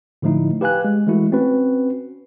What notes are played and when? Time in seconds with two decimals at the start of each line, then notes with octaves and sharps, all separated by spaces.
0.22 A2 D3 F3 A3 D#4 E4
0.61 G4 B4 F5 G#5 F#6
0.85 G#3
1.07 E3 G#3 A3 E4 F#4
1.32 C4 C#4 F#4 B4